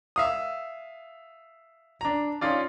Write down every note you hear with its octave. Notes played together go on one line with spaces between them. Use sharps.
E5 F5 D#6
D4 A#5
C#4 D#4 F4 D5